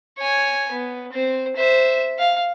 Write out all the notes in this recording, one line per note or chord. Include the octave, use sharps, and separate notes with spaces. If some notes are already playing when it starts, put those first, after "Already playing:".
C#5 G#5
B3
C4 C5
C5 E5
F5